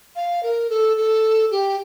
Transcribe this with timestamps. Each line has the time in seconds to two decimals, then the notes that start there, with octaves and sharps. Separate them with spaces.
0.16 F5
0.43 A#4
0.70 A4
0.97 A4
1.51 G4